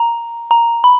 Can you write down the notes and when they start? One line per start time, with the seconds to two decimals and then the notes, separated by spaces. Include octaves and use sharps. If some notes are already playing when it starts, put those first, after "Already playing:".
Already playing: A#5
0.51 A#5
0.84 B5